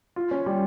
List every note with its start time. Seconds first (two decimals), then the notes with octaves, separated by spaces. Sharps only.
0.16 F4
0.31 C#4
0.46 G3